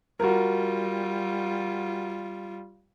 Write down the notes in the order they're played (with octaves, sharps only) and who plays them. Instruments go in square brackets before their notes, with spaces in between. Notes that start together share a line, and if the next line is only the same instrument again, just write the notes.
[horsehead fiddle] G3 F4 [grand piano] F#4 A#4